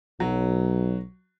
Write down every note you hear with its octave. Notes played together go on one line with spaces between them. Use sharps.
B1 F#3